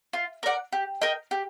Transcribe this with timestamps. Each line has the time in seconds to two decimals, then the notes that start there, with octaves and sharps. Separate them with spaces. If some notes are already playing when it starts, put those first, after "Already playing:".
0.13 F4
0.43 A#4 D5 F#5
0.73 G4
1.02 A#4 D#5 G5
1.31 G4